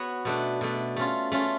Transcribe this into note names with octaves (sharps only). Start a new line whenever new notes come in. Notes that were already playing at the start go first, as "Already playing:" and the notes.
Already playing: B3 F#4 C#5
B2 A3 D4
B2 A3 D4
A3 C#4 F4
A3 C#4 F4